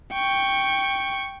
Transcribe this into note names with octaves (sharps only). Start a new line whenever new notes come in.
G5 C#6